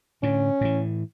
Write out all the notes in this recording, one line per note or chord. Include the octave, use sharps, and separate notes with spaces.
A2 D3 C#4
A2 E3